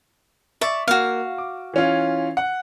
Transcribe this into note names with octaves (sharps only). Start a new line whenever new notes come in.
D5 E5 C#6
A#3 F#4 F5
D6
E3 C#4 F4
F#5